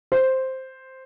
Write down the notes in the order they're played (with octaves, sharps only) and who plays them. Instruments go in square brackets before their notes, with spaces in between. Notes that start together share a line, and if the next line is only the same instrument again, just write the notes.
[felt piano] C5